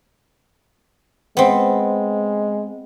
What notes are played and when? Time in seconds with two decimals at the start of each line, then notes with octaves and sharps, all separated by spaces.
1.37 G#3 B3 C4